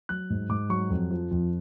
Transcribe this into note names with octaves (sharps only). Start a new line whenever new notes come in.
F#3 F#6
G#2
G#2 D6
F#3 C#6
F2
F3
F2